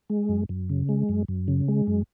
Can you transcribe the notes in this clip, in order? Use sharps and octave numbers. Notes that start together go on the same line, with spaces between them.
G#3
F#2
F#2
C#3
G#3
F#2
F#2
C#3
G#3
F#2